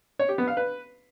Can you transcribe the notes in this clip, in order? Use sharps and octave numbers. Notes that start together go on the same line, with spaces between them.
C#5
G4
B3
F5
B4